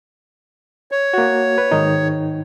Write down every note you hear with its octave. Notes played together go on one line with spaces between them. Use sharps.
C#5
A#3 F#4
B4
G#2 D#3 D#4